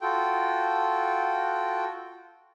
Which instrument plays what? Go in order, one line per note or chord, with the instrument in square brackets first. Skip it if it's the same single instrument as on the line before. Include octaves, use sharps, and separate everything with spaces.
[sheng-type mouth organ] F4 F#4 A4 G5